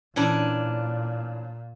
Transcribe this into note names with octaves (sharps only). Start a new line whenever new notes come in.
A#2 E3 C#4 D4